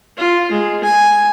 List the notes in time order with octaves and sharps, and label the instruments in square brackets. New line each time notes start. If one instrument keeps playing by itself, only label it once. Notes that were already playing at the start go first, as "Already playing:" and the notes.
[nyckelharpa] F4
G#3
G#5